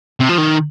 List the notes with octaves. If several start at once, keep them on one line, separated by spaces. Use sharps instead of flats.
C3
F3
D#3